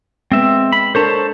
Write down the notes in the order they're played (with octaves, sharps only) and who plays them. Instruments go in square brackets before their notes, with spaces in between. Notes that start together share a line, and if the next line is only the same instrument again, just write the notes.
[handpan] G#3 B3 [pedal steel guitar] C4 E5
[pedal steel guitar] B5
[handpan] D4 A4 A#4 [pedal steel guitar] C5 C#5 A5